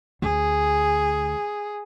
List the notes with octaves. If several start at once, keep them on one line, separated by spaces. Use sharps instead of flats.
D2 G#4